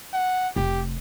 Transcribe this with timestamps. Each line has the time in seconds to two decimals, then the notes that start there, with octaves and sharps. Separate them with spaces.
0.13 F#5
0.56 F1 G4